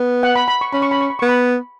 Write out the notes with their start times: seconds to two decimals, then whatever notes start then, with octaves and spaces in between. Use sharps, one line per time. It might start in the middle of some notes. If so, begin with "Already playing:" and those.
Already playing: B3
0.23 F#5
0.36 B5
0.48 B5
0.61 C#6
0.73 C#4 B5
0.82 C#6
0.91 B5
1.01 C#6
1.10 B5
1.19 B3 C#6
1.29 B5